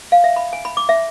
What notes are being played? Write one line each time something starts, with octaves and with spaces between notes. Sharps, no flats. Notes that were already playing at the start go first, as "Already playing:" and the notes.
F5
E5
B5
G#5
B5
D6
E5